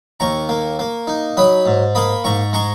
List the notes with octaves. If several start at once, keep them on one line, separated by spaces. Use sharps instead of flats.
D#2 A#5 C#6
A#3
A#3
D#4
F#3 B5 D#6
G#2
A#3 B5 D#6
G#2 A#5 C#6
G#3 A#5 C#6